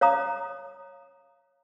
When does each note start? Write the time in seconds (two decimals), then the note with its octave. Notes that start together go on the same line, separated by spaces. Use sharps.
0.01 C#5 F5 A#5 D#6